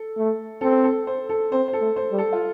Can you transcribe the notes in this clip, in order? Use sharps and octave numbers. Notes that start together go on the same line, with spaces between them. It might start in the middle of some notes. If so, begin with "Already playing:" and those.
Already playing: A4
A3
C4 A4
A4
C5
A4
C4 C5
C5
A4
A3
C5
G3
A4
F4